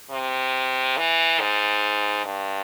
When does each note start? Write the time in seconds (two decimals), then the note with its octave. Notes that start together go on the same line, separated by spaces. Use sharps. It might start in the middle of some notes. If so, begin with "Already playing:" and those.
0.11 C3
0.98 E3
1.40 G#2
2.25 G2